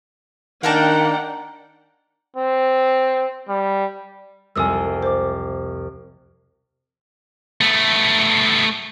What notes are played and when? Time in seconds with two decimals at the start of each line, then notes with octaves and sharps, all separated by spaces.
0.63 D#3 A#3 D4 A#4 F#5 G5 A5
2.36 C4
3.49 G3
4.56 C2 F2 A3 G#5 D#6 E6
5.03 C5 D6
7.61 A3 B3